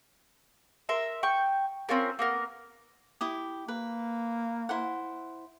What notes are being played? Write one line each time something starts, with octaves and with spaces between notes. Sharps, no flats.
A#4 E5 C6
G5 C#6
C4 C#4 F4 A#4
A#3 B3 A#4
E4 G4 D#6
A#3 B4
E4 C5 F#5